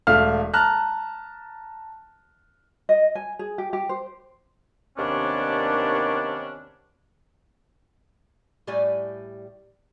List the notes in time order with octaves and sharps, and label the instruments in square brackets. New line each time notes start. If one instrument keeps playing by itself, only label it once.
[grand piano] E1 A3 F5 F6
A5 A#5 F6 F#6
[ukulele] D#5
G#5
G#4
G4
G4
C5
[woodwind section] D#2 C3 D#3 B3 C#4 D4
[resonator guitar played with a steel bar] A2 G3 G4 D5 G#5